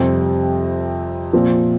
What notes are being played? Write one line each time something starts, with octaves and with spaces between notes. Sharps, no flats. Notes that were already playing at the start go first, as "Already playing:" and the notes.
Already playing: F2 C3 G3 C4
A#2 F3 C4